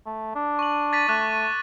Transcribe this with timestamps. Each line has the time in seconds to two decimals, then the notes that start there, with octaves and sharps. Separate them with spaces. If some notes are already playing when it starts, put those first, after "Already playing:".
0.06 A3
0.35 D4
0.59 C#6 F#7
0.93 A6 B6 D#7
1.08 A3 D6 F#6 A6